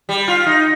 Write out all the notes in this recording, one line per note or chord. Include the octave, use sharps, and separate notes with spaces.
G3
F4
D#4